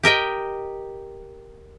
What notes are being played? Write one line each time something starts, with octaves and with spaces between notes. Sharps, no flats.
G4 A#4 D#5 G5